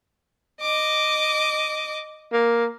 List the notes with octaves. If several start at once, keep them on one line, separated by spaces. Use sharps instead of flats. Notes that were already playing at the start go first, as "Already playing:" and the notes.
D#5 D6
A#3